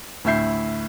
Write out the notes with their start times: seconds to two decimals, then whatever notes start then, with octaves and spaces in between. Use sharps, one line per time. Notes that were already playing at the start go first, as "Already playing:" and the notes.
0.24 D2 A2 E4 E5 G6 C7